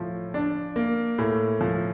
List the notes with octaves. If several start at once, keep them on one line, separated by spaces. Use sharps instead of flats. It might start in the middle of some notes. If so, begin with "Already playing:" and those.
Already playing: A2 F3
D4
A#3
A2
F3